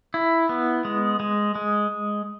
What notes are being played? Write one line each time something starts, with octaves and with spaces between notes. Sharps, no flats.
E4
B3
G#3
G#3
G#3